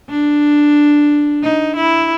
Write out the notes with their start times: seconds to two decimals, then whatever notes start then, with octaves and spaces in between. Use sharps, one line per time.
0.10 D4
1.43 D#4
1.76 E4